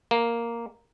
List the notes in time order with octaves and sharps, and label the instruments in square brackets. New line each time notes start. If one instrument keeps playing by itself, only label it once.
[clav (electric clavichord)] A#3